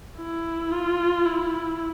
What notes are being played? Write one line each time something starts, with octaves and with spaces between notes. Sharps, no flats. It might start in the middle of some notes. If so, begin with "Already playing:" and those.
E4
F4
E4